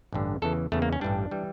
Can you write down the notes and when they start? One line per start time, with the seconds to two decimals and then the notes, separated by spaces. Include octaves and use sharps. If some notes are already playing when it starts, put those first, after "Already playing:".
0.12 A1 G2 D3
0.42 E2 C#3 E3 A4
0.72 E2 C#3 E3 A3
0.82 A#3
0.93 C#4
1.01 A1 G2 E3 G3 D4
1.31 E3 G3